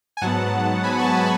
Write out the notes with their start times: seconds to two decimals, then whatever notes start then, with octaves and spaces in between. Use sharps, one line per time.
0.17 G#5
0.22 G#2 F#3 B3 F#5 A5
0.84 G#5 B5
0.99 A5 C#6
1.15 G#5 B5